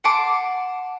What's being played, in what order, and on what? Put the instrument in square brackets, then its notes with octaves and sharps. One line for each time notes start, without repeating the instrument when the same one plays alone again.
[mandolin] F#5 A5 C6 D6